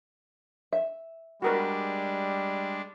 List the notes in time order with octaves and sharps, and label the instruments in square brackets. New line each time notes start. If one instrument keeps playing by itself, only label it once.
[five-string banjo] E5
[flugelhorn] G3 [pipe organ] G#3 D4 [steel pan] F#4 A#4 B4